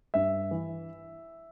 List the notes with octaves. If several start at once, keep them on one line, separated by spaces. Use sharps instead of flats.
G2 E5
E3